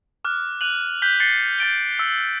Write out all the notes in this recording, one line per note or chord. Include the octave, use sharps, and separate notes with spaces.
D6 F6 F#6
F#6 D#7 F7 F#7
F#6 G6 B6 G7
A6 C7 C#7 F#7 G7
G6 A6 D7 G7
E6 C7